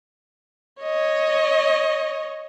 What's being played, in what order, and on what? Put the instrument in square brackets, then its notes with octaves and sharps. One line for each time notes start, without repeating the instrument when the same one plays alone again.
[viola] C#5 D#5